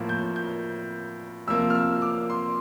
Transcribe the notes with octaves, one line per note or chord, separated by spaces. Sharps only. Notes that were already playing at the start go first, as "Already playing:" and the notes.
Already playing: A2 F3 A#3
G6
G6
C3 F3 A#3 E6
F6
E6
D6
C6